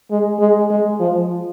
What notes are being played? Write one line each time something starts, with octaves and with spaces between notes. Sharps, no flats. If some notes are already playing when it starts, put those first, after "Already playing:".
G#3
G#3
G#3
F3